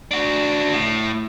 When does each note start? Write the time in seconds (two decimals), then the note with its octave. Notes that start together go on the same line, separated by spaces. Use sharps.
0.11 D4 F#4
0.73 A2